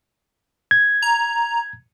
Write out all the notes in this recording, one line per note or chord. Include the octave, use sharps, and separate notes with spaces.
G#6
A#5